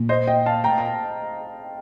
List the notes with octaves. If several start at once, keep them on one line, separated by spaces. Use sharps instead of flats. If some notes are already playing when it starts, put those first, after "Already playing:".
Already playing: A#2
C5 D#5
D#5 G5
F5 A5
A2 G5 A#5
A#2